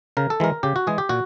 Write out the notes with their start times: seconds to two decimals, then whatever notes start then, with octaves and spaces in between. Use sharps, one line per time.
0.17 C#3 A#4
0.30 A4
0.40 E3 G#3 A#4
0.63 C#3 G4
0.76 F#4
0.87 E3 G#3 G#4
0.98 G4
1.09 A#2 F#4